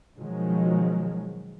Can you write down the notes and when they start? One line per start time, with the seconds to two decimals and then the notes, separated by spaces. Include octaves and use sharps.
0.18 B2 D#3 F3 F#3 G#3